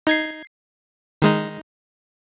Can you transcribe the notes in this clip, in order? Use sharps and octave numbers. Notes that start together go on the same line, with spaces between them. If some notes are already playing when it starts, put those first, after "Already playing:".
D#4 G#6 C7
D#3 G#3 D#4